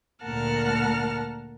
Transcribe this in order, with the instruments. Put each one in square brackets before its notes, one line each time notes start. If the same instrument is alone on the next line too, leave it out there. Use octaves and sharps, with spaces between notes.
[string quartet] D2 A#2 A#4 F#5 A5 F6